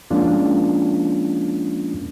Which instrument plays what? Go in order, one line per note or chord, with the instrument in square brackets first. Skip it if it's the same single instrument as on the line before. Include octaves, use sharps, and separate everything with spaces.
[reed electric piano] F3 G#3 A#3 C#4 D4 F4